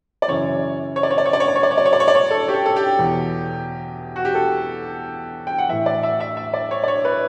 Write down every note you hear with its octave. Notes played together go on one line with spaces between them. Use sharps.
D5
F#2 C#3 E3 C#5
C#5
D5
C#5
D5
C#5
D5
C#5
D5
C#5
D5
C#5
D5
C#5
D5
C#5
D5
C#5
A4
G4
A4
A4
G4
E2 B2
F#4
G4
A4
G5
F#5
A2 E3 E5
D5
E5
E5
E5
D5
C#5
D5
C#5
B4